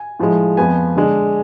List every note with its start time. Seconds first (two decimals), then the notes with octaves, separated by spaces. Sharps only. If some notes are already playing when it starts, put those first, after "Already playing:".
Already playing: G#5
0.20 A2 F3 G#3
0.57 F2 F3 B3 G#5
0.95 D3 G#3 D4